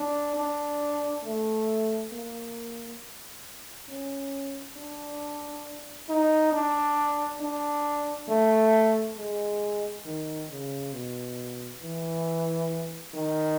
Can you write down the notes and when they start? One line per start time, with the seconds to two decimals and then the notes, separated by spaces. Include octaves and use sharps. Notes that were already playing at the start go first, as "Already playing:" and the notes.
Already playing: D4
0.36 D4
1.24 A3
2.11 A#3
3.89 C#4
4.77 D4
6.09 D#4
6.52 D4
7.40 D4
8.29 A3
9.17 G#3
10.05 D#3
10.50 C#3
10.93 B2
11.81 E3
13.14 D#3